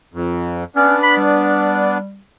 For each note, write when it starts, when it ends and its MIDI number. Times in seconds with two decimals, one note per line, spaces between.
0.14 0.64 41
0.76 1.98 59
0.76 0.97 61
0.76 1.98 62
1.03 1.17 83
1.17 2.20 55